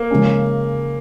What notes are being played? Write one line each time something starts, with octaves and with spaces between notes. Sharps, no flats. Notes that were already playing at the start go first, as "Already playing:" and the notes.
Already playing: A#3
C#3 G#3 C#4